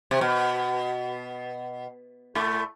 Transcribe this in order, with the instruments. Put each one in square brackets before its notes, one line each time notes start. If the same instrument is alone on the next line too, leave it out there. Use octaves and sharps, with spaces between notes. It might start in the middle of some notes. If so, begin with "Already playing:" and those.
[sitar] C3
B2
A2 A3